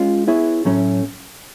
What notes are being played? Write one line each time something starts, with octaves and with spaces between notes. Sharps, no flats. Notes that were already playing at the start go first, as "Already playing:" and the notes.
Already playing: G#3 C#4 F4
B3 E4 G#4 C#5
A2 F#3 A3 C#4